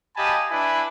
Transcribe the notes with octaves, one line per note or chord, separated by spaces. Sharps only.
G4 D#5 F5 G#5 A5 B5
D4 E4 B4 G#5 B5